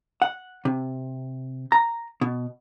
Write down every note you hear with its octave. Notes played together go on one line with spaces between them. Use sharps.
F#5
C3
A#5
B2